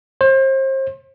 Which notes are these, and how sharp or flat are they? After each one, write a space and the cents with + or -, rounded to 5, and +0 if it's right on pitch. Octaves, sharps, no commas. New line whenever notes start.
C5 +35